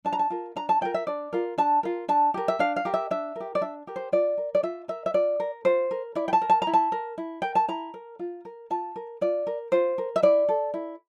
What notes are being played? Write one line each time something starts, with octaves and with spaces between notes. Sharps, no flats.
D4 A5
A#5
A5
F4 A#4
D4 A#5
A5
F4 A#4 G5
E5
D4 D5
F4 A#4
D4 A5
F4 A#4
D4 A5
G4 A#4
E5
D4 F5
F5
G4 A#4
E5
D4 E5
G4 A#4
D5
D4 E5
G4 A#4
C5
F4 D5
A#4
D5
F4 E5
A#4 E5
E5
F4 D5
A#4
F4 C5
A#4
E4 D5
G5
A5
A#4
A5
A#5
E4
A5
A#4
E4
A#4 G5
A5
E4 A#5
A#4
F4
A#4
F4 A5
A#4
F4 D5
A#4
F4 C5
A#4
E5
E4 D5
A4
E4